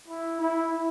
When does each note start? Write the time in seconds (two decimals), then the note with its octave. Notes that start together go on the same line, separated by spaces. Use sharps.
0.08 E4
0.40 E4